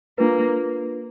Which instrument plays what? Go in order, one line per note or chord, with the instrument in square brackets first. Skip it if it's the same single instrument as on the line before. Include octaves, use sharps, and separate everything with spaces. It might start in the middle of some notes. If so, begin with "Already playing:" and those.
[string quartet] A#3 [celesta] D4 F4 B4